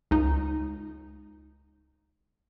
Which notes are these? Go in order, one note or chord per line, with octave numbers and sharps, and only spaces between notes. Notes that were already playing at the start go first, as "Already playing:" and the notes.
C#2 D#4